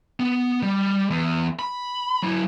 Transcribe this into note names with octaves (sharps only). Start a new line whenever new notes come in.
B3
G3
E2
B5
F#3 E4